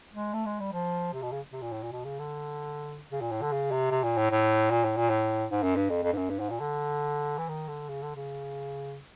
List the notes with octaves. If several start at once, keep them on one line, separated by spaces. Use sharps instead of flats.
G#3
A3
G#3
G3
F3
C3
B2
C#3
C3
A#2
A2
A#2
B2
C#3
D3
C#3
A#2
A2
D3
C#3
C3
C3
A#2
A2
A2
A#2
A2
A#2
A2
G#2
F#2
G2
F2
F2
G2
F#2
G2
G#2
A#2
D3
E3
D#3
D3
C#3
D3
C#3